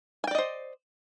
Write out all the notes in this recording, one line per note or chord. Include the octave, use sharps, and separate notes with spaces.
C5 D5 D#5 G5 G#5